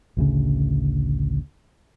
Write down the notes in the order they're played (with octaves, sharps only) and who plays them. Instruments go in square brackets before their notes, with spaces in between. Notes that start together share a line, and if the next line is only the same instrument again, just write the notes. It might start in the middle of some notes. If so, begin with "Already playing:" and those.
[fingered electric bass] A1 D2 C#3